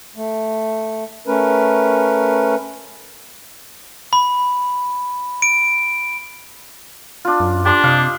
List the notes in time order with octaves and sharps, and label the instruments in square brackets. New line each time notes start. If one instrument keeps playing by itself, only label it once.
[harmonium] A3
A3 C#4 A#4 B4
[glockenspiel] B5
D7
[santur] D4 F4
[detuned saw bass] F#2
[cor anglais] D4 [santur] G4 C6
[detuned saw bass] C3 [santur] D#5 F5